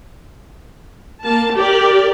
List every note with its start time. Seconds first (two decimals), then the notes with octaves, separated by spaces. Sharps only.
1.21 A#3 A5
1.53 G4 A#4 D5